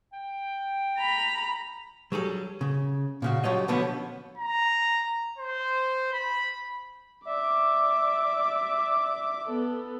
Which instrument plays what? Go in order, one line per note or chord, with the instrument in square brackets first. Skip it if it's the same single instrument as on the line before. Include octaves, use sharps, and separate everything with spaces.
[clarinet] G5
[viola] A#5 B5
[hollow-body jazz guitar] F#3 G3 G#4 A4
C#3
A#2 C#3 F#4
F#3 G3 A3 F4 C#5 D#5
B2 D3 F3 B3 C#4
[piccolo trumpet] A#5
C5
B5
[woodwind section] D5 E5 [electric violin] D6
[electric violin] B3 A4